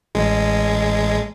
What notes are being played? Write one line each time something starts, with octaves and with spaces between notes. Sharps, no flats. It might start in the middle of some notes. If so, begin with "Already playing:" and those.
A1 G#3